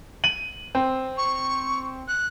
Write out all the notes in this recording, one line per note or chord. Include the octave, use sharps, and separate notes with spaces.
D#7 F#7
C4
C#6
F#6